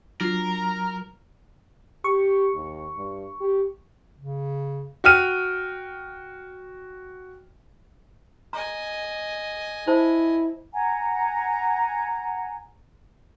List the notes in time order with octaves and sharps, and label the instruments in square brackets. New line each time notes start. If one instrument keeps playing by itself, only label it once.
[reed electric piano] F#3 [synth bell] D4 F4 [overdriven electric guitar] A#4
[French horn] G4 [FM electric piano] C#6
[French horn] D#2
G2
G4
[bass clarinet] C#3
[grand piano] F#4 G5 F6 D#7
[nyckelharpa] D#5 G#5 [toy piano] A#5
[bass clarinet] E4 [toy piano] C5 A5
[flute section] F#5 G#5 A#5